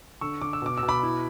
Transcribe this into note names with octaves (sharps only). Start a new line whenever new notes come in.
D3 C#6 E6
D3 D6
E6
B2 D6
E6
B2
B5 D6
E4